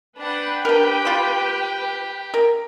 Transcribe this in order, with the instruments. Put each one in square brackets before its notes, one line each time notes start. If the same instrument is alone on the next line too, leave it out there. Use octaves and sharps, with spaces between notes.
[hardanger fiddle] D4 F#5 [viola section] B4 G5
[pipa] D4 A#4 [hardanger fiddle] G4
[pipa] F4 B5
A#4